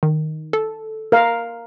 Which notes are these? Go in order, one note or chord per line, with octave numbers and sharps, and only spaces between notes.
D#3
A4
A#4 F5